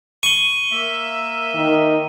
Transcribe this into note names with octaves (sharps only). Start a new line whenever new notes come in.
C#6 D#7 G7
A#3 E5
D#3